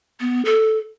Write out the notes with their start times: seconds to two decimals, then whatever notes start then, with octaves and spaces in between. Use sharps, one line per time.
0.20 B3
0.45 A4